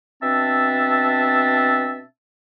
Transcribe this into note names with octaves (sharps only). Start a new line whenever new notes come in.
B2 C4 D4 E5 A5